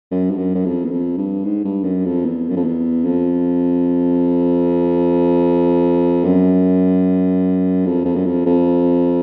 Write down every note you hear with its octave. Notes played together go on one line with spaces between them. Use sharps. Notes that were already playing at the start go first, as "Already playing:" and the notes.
F#2
G2
F#2
F#2
F2
E2
F2
G2
G#2
G2
F#2
F2
E2
F#2
F2
E2
F2
F#2
F2
F2
F#2
F2
F2